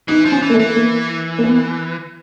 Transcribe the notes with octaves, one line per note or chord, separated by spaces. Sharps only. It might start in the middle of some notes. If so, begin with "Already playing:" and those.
E3 D#4
F3
C#4
E3
A#3
A3
E3
A#3
A#3
B3